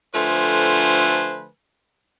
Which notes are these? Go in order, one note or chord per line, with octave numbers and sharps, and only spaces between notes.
D3 F3 A3 B4 C5 G#5